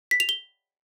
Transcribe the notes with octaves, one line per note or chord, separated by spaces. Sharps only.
B6
F7
G7